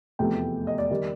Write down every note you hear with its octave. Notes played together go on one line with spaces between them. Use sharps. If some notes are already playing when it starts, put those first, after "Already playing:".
F1 E2 C3 F3 A3 G5
D#5
D5
D#3 G3